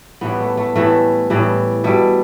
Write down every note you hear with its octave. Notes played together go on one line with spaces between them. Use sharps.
A2 E3 G3 B3
A3
A3
A2 E3 G3 A3
A2 E3 G3
B2 G3 A3